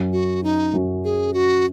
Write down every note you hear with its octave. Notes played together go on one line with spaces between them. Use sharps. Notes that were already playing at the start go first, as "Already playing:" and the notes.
Already playing: F#2 F#3 C#4
F#4
D#4
F#2 F#3 C#4
G#4
F#4